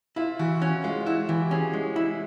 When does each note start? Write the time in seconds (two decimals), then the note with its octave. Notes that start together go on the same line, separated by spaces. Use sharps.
0.16 E4 F4
0.39 E3 F#4
0.62 C#4 F#4
0.84 G#3 F4
1.06 E4 F#4
1.28 E3 G4
1.51 C#4 G#4
1.73 G#3
1.96 E4